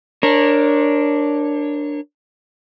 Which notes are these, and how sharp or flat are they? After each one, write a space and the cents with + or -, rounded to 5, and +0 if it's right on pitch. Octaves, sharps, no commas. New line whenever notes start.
D4 +0 A#4 +0 C#5 -25